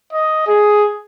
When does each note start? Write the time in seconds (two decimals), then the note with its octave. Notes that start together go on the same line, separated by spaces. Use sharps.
0.13 D#5
0.47 G#4